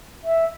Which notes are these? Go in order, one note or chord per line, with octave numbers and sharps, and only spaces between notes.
E5